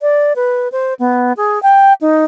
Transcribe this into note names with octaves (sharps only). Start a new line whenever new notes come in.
D5
B4
C5
B3
G#4
G5
D#4